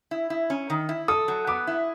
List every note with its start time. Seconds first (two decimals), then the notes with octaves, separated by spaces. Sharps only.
0.11 E4
0.30 E4
0.50 C#4
0.70 D#3
0.89 E4
1.08 A4 D#6
1.28 F#3
1.47 B3 D6
1.67 E4